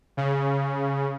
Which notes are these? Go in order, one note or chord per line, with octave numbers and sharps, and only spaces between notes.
C#3